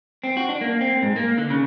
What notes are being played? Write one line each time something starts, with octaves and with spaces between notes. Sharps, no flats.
C4
F#4
D4
A#3
C4
G#2
A#3
D3
C#3